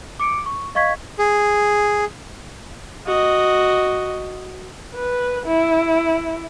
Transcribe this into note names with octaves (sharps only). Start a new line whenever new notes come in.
D6 C#7 D7
C#6
D#5 F5 C#6 G#6 B6
G#4
F#4 D#5
B4
E4